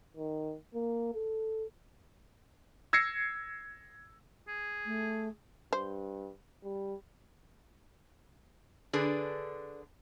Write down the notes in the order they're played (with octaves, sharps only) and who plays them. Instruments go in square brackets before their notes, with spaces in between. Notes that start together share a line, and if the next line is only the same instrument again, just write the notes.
[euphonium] D#3
A#3
A4
[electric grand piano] E6 G#6 A#6 C7 C#7
[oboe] G#4
[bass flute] A3
[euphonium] G2 [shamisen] C5
[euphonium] G3
[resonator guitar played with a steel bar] D3 D4 G#4 B4